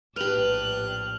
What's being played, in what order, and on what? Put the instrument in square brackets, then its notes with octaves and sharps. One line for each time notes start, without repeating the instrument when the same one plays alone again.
[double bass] A#1 A2 [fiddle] D4 F#6 [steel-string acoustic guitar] G4 B4 [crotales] F6 F7